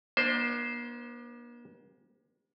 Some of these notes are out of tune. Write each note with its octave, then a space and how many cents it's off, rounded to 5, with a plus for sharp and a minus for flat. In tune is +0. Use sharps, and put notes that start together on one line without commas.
A#3 +45 D4 +30 C5 +0